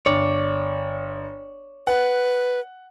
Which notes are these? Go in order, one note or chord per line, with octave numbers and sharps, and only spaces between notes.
G1 C#5 D5
B4 F#5